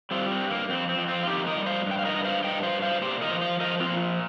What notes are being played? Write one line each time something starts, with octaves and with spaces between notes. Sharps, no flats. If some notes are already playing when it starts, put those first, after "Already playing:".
G3 C4 F4
C4
G2
A#3
F2 C4
C4
F2
C4 F4
F4
F2 D#4 G4
A#4 D#5
G3
C5 F5
G2 G5
F5
A#4 D#5
G2
C5 F5
G2 D#5 G5
C5 F5
G2
C5 F5
A#2 G4 C5
A#4 D#5
F3
C5 F5
F3 A#4 D#5
C4 F4
A#2